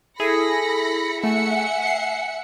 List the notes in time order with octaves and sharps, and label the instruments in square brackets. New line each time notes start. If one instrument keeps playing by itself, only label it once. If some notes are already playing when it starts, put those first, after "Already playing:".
[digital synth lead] E4 [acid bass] G#4 [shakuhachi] A4 [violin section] B5 A#6 C#7
[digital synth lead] A3 [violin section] E5 F#5 C#7 [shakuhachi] G#5
[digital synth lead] C7